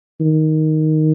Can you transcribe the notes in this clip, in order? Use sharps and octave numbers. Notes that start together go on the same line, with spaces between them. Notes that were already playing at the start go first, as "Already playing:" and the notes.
D#3